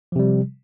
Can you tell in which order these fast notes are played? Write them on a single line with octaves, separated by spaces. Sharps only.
F3 C3 G3